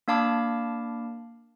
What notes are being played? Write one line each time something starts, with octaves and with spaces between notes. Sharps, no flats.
A#3 D4 F5 A5 B5 D6